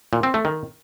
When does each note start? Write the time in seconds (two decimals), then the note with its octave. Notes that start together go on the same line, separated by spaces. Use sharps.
0.13 A#2
0.23 C4
0.34 A3
0.45 D#3